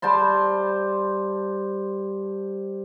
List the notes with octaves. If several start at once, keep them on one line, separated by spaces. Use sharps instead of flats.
G3 C5 A5 C6